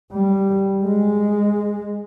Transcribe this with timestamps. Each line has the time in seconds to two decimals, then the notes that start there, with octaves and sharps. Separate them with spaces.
0.12 G3
0.85 G#3